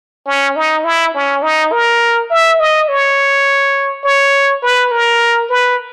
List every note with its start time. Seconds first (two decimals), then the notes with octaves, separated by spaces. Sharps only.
0.27 C#4
0.56 D#4
0.84 E4
1.14 C#4
1.43 D#4
1.72 A#4
2.31 E5
2.60 D#5
2.89 C#5
4.04 C#5
4.63 B4
4.92 A#4
5.50 B4